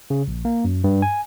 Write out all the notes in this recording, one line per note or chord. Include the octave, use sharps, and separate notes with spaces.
C#3
A#1
A#3
F#2
G2
G#5